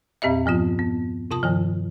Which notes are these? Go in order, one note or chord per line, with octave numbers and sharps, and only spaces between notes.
E2 A#2 C4 G4 D#5 E5
G2 F3 B3 F4
B3
C3 F4 A5 D#6
G2 D#3 F3